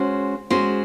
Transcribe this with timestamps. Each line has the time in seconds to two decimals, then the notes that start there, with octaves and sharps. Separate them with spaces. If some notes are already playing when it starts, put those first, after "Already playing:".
Already playing: G#3 C#4 F#4 C5
0.50 G#3 C#4 F#4 C5